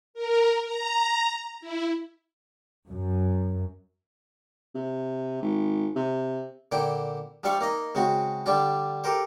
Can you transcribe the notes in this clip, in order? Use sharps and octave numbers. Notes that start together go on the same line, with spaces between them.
A#4
A#5
E4
F#2
C3
G#1
C3
A#2 D3 E4 G5
F3 G3 D4 E5 F5 C#6
A#3 D#4 D#5
C#3 G#3 C4 F#4
D3 G3 D4 F4
G4 A4 A#4 C5